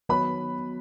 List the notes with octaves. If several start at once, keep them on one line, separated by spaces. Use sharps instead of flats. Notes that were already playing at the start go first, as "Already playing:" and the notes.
D#3 F#3 B3 F#4 B4 C#5 B5